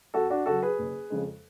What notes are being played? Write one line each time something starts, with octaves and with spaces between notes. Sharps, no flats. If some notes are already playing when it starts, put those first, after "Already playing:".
F2 F#4 A4
D4 F#4
C#3 F#3 F#4 A4
G#4 B4
F#1
F2 C#3 F3 G#3